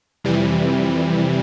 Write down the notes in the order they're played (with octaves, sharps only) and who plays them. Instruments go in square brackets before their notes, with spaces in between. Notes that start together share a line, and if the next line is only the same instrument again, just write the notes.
[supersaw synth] F2 C3 E3 G3